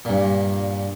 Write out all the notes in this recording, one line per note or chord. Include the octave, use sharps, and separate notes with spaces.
G2 A#2